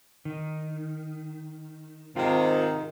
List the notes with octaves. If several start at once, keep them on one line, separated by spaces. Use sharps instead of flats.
D#3
G#2 C3 D#3 F4